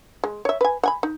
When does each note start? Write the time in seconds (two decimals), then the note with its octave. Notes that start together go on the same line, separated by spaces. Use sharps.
0.24 G#3
0.45 C#5 E5
0.61 B4 G#5
0.83 F#5 G#5 B5
1.03 D#4